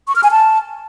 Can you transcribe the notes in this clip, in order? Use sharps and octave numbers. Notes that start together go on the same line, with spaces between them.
C#6
F6
G#5
A5